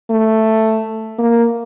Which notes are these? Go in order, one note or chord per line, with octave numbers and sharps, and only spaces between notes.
A3
A#3